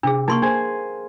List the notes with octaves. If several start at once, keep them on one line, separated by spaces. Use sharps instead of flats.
C3 D4 G#4
A#3 D#4 C6 C#6
G#4 C5 G#5